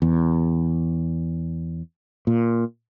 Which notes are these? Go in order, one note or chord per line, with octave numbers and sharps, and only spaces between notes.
E2
A#2